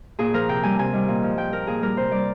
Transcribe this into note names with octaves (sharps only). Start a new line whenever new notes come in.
A#2 G#4
F3 A#4
C3 G5
G3 G#5
C3 G#5
D#3 G3
A#2
F3
A#2 G5
F3 A#4
A#2 G#4
G3 A#4
C3 C5
G3 D5